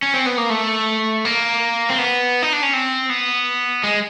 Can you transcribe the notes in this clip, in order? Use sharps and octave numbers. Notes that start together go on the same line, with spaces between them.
C#4
C4
B3
A#3
A3
A#3
C4
B3
D#4
D4
C#4
C4
B3
G#3